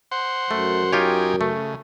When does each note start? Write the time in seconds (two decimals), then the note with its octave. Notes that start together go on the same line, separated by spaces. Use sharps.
0.11 C5 F#5 C6
0.51 F#2 A3
0.92 D#4 F4 G4 C#5 G5 G#5
1.41 C#3 A3